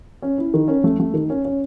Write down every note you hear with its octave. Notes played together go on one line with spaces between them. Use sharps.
C#4
E4
D#3
C#4
A3
A3
D#3
C#4
C#4